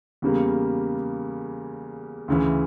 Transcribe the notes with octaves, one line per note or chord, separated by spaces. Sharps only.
E2 C#3 G3 A#3
D2 C#3 E3